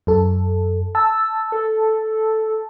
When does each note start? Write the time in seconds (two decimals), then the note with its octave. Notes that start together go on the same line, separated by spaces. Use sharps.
0.07 F#2 A4
0.95 A5 E6
1.52 A4